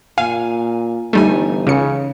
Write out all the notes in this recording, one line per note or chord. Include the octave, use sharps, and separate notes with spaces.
A#2 F5 G#5
G1 E3 G3 A3 D#4 G#5
C#2 C#3 C#7